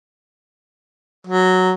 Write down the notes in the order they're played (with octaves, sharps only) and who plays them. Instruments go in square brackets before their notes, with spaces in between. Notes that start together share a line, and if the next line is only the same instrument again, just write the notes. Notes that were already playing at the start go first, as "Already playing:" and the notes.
[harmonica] F#3